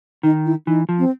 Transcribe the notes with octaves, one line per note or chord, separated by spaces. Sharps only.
D#3 D#4
E4
E3 D#4
F3
C4